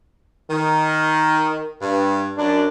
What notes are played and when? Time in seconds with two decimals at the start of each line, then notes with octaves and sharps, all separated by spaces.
0.51 D#3
1.81 G2
2.37 F#2 D4